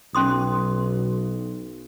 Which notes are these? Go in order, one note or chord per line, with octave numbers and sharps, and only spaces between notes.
B1 C#4 C6 D#6